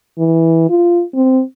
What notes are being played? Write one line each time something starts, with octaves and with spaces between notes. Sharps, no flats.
E3
F4
C4